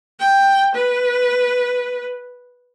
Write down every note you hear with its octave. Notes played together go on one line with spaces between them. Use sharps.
G5
B4